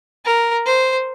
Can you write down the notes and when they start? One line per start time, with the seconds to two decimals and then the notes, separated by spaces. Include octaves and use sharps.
0.25 A#4
0.66 C5